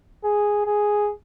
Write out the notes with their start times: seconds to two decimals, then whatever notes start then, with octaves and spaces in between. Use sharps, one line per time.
0.24 G#4
0.66 G#4